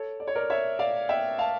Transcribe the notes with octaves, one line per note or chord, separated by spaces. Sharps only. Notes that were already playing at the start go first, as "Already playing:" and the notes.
Already playing: A4 C#5
D5
C#5
A#4 D5
C#5 E5
D5 F5
E5 G5
F5 A5